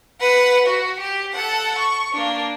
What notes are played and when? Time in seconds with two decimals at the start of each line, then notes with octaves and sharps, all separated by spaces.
0.20 B4 F#5
0.66 F#4
1.00 G4
1.33 A4 F#5
1.78 C#6
2.13 A#3 D4